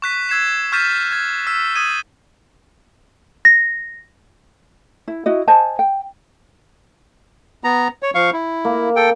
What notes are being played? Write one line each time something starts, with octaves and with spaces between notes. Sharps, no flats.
C#6 F#6 B6 D#7
E6 G#6 C7 E7
C#6 F6 G6 A6 B6 D#7
G#6
E6 F6 B6
D#6 G#6 D#7
A#6
E4
E4 F#4 D#5
C5 D#5 G#5 A5
G5
B3 A#5
C#5
F3 F5 C#6
E4
A#3
A4 G5